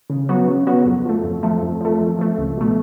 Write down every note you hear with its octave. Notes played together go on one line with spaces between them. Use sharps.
C#3
F#3 B3 F#4
C#3
F#3 B3 F#4
F2
F3 A3
F2
F3 A3
F2
F3 A3
F2
F3 A3
C#2
B2 A3